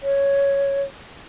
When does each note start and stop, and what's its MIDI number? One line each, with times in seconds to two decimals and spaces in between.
0.03 0.82 73